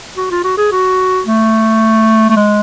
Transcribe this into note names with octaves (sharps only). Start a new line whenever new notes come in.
F#4
F4
F#4
G#4
F#4
A3
A3
G#3